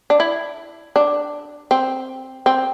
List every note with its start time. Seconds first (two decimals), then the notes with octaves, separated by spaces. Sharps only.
0.10 D4
0.20 E4
0.96 D4
1.71 C4
2.46 C4